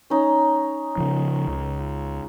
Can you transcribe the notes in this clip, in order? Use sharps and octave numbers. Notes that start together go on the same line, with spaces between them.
C#4 D#4
C#3 F3
C#2